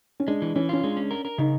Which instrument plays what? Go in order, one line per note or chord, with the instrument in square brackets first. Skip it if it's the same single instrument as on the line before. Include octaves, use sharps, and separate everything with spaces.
[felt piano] C#4
[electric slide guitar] G#3 [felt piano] D4
[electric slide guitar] E3
[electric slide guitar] E3 [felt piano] C#4
[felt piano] C#4 [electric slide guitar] F4
[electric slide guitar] G#3 [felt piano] D4
[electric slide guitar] C#4
A#4
A#4
[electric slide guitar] C#3 [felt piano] D#4